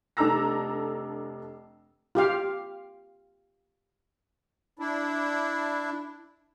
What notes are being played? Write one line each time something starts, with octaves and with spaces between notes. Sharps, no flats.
F1 D4 A4 A#5 E6 A#6
F4 G4 F5
D4 E4